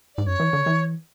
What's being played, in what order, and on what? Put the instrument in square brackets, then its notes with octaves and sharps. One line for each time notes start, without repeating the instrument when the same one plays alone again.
[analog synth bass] G#2 [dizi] D5
[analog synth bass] F#2 [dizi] C#5
[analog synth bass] E3
D3
E3